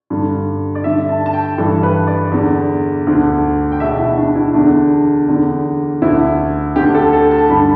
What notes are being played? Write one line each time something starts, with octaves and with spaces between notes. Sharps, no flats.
G2 D3
D5
G2 D3 E5
A5
A5
G5
G2 E3 A4
B4
D5
E2 D3
D2 D3
G5
E2 B2 E5
E4
D4
E4
E2 D3 D4
E2 D3
D2 D3 E4
D2 D3 G4
A4
A4
A5
G2 D3 B5